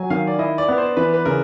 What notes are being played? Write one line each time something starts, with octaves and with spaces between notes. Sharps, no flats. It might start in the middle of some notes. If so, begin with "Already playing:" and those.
Already playing: F#3 G#5
D#3 F5
D5
E4 D#5
D5
B3
C5
E3 B4
B4
C#3 A#4